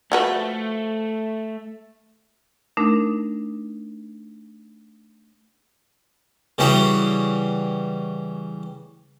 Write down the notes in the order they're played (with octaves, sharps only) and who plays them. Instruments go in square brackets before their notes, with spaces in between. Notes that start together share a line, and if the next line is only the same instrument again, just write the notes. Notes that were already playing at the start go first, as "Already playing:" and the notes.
[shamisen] F3 F#4 B4 [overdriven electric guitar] A3
[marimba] A3 D4 D#4 A#4
[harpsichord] C#3 E3 G3 C#4 F#4 G#4